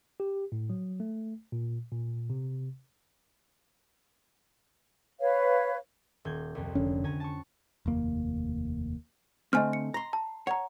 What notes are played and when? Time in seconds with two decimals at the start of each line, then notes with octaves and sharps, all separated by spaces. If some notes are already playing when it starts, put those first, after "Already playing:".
0.20 G4
0.52 A2
0.70 F#3
1.00 A3
1.52 A#2
1.92 A#2
2.30 C3
5.20 B4 C#5 F5
6.25 D#1 G6 G#6
6.55 C2 F2
6.75 F1 D3 C#4
7.04 D3 C#4 G#5 A#5
7.20 A5 C#6
7.86 F1 D#2 A#3
9.53 D3 A3 C4 D#5 G#5 F6
9.73 C#7
9.94 A#5 C6
10.13 A5
10.47 C#5 F#5 A#5